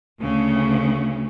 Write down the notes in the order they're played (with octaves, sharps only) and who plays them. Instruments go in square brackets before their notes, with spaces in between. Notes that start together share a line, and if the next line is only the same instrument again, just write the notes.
[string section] D2 C#3